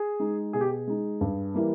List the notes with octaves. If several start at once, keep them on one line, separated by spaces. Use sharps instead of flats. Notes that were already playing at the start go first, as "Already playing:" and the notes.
Already playing: G#4
G#3 D#4
B2 G#4
G4
G#4
G#3 D#4
G2
E3 G3 A#3